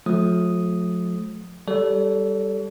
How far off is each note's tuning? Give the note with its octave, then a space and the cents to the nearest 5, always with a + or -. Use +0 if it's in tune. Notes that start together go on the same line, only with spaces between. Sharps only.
F3 +35 A3 -30 D#6 +0
G3 +0 A4 +0 C#5 +40